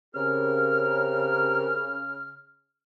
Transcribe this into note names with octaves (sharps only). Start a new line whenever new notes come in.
C#3 C4 G4 A#4 F6